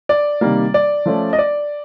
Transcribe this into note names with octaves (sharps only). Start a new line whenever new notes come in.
D5
C3 D#3 G3 A#3
D5
F3 A3 C#4
D#5
D5